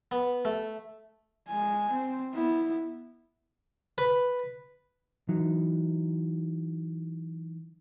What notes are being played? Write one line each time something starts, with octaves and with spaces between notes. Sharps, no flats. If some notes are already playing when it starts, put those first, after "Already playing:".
B3
A3
G#3 G#5
C4
B3 E4
B4
E3 F#3 D#4